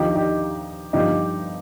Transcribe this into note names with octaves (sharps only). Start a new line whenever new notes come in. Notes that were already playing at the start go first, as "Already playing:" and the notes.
Already playing: D#2 D3 F3 D#4 G4
D#4 G4
G1 G2 F3 D#4 G4